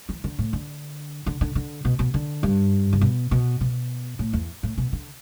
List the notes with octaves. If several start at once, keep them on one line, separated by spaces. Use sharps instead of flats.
E3
D3
A2
D3
D3
D3
D3
B2
B2
D3
G2
D3
B2
B2
B2
A2
E2
A2
B2
D3